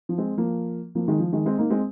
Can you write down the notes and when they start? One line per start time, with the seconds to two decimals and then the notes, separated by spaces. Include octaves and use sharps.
0.09 F3
0.18 G#3 C4
0.37 F3 A#3
0.95 F3 A#3
1.08 D#3 G#3
1.19 F3
1.33 D#3 G#3
1.46 G#3 C4
1.58 A#3 D#4
1.70 G#3 C4